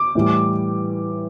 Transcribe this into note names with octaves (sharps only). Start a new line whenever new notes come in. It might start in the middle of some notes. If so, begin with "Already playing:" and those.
Already playing: D6
A2 E3 G3